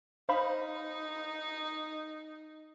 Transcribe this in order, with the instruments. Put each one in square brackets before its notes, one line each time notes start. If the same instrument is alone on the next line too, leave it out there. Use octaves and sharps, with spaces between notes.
[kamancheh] D#4 [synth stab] C5 F5 B5